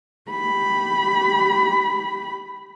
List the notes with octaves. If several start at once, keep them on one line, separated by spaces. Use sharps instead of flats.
G4 B5